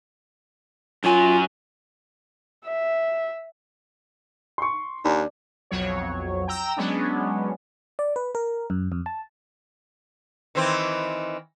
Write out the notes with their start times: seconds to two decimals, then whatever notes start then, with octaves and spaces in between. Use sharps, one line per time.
1.04 F#2 F#3 F4 G#5
2.65 E5
4.58 C6 C#6
5.05 D#2 D4
5.71 B1 F2 F#3 C#5
6.48 G5 A#5 E6
6.77 F#3 G#3 B3 C#4 D4
7.99 D5
8.16 B4
8.35 A#4
8.70 F#2
8.92 F2
9.06 A5
10.55 D#3 E3 C4